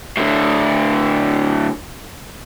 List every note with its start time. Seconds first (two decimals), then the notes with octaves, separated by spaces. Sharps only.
0.17 A2 D3